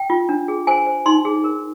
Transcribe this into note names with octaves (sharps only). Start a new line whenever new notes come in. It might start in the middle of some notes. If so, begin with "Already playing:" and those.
Already playing: G5
F4
D4
G#4
C5 G#5
C5
D#4 C6
G#4
A#4